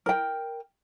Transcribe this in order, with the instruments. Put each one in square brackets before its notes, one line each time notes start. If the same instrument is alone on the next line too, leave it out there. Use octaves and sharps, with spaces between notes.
[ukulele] A#4 G5